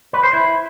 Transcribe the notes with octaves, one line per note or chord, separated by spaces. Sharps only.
B4
C5
E4